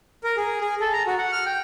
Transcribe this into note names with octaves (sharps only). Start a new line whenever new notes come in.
A#4
G#4
G#4
A4
A#5
F#4
F#5
F6
G5